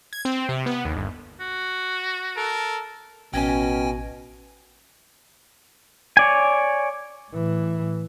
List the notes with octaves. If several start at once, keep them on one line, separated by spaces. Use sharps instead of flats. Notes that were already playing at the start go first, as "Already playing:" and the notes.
G#6
C4
C3
B3
D#2
G1
F#4
A4 A#4
A1 B2 C#4 G5 G#5 G#6 A#6
C#5 D5 G#5
A2 E3